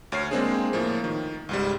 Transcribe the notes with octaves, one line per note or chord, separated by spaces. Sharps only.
D2 C#5 F6 C7
G#3 A#3 C4 D4 G#4
A2 F3 A#3
D#3
C#2 G#2 G3